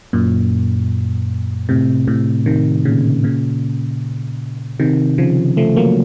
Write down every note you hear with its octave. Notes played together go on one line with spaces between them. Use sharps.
F#2 A#2
A2 C3
A2 C3
C3 D#3
A#2 C#3
A#2 C#3
C3 D#3
C#3 F3
F3 A3
F#3 A#3